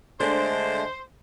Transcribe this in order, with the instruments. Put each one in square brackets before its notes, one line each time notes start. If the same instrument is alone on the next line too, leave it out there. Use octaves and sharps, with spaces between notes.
[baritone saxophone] D3 [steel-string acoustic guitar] G#3 A3 D4 [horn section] C5